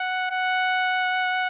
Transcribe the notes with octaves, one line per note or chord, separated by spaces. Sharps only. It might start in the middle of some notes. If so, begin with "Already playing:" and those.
Already playing: F#5
F#5